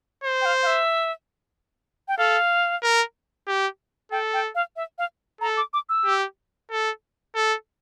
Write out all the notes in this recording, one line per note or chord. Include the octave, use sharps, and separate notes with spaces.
C5
G5
F5
F5
E5
G5
A4 F5
A#4
G4
A4 G5
G5
F5
E5
F5
A4 A#5
D6
D6
E6
G4
A4
A4